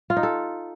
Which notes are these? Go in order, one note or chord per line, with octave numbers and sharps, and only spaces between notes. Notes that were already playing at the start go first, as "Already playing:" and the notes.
F4
D#4
A4